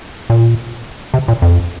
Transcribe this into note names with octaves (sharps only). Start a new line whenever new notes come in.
A#2
C3
A#2
F2